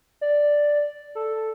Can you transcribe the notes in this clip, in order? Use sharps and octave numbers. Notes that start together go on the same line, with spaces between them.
D5
A4